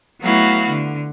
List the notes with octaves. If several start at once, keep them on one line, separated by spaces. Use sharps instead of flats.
F#3 A3 B3 E4 F#4 F5
D3